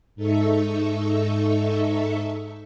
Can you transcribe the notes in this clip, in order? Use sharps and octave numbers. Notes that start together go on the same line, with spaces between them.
G#2 D#4 A4 E5 C#6